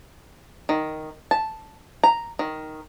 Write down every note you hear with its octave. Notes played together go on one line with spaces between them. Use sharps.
D#3
A5
A#5
D#3